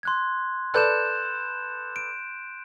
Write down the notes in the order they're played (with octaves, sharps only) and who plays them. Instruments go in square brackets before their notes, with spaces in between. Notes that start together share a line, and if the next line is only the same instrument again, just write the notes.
[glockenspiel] C6 F#6 G#6
[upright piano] A4 B4 D5 [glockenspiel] F#6 G6 E7
[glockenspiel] D7